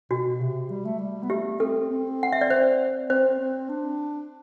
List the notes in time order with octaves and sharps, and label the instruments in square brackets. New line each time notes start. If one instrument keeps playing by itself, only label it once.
[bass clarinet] B2 [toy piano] F#4
[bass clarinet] C3
G3
A3
G3
B3
[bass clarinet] A3 [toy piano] G4
[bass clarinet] C4 [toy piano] A4
[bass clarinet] C4
[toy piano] F#5
E5
D5
C5
[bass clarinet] C4 [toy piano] C5
[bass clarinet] C4
D4